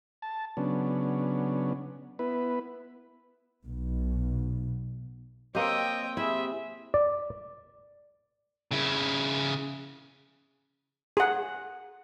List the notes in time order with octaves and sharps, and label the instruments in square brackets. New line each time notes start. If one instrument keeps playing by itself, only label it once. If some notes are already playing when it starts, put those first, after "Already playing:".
[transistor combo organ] A5
C#3 F#3 B3 C#4 D4
B3 E4 B4
[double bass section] B1 B2
[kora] A#3 G4 [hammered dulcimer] C4 [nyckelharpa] C#5 G5 [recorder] D#5
[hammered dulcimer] C3 [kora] E4 [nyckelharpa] G#4 [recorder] E5
[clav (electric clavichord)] D5
[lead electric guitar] C#3 E4
[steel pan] G#4 F#5